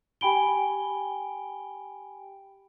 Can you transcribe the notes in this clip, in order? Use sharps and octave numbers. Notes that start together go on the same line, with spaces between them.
G4 G5 G#5 B5 D7 G7